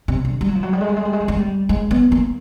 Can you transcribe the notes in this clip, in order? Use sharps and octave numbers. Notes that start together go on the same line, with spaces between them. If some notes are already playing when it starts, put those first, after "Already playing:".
C3
D3
G3
F#3
F3
F#3
G3
G#3
G3
G#3
G3
G#3
G3
G#3
G3
G#3
B3
A#3